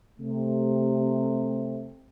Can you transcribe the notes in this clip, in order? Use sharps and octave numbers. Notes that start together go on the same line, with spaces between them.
C3 A3